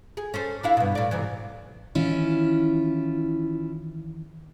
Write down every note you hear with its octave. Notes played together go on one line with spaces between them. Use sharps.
G#4
C#4 A4 C5
D4 E4 F5
G2 B2
A2 D5
G#2 C3 E3
D#3 E3 C#4 E4 F4